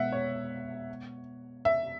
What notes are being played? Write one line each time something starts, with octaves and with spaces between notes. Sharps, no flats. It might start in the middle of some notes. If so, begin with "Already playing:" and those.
Already playing: B2 G#3 B3 E5 F#5
C#5
E5